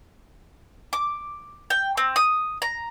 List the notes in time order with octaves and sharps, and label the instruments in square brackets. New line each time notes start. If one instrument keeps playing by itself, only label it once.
[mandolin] D6
G5
C4
D#6
A#5